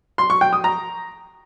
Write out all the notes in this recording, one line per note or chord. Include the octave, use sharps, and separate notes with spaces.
C6
C#6
G5
D#6
A#5